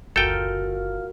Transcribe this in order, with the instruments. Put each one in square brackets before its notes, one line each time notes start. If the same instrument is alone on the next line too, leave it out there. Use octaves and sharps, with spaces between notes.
[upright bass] F#1 D2 [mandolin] F4 G6 [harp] F#4 A#4 [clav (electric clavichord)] A4 G5